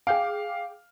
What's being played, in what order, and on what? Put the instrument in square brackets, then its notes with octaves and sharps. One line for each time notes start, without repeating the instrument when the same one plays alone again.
[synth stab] G#4 G5 D6 [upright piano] F5